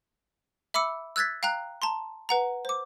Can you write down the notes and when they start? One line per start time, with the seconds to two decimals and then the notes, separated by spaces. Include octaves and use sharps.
0.74 E5 B5 D6 E6 C#7
1.16 E6 F#6 G#6 A6 B6
1.43 F5 G5 A#5 F#6
1.82 A5 A#5 C6
2.29 B4 F#5 A#5
2.65 C5 D6